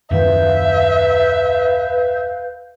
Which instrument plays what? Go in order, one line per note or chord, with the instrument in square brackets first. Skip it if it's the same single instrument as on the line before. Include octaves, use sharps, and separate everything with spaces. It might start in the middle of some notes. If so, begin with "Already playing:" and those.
[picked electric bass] D#1 F#2 D#3 [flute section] B4 F5 G6 [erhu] E5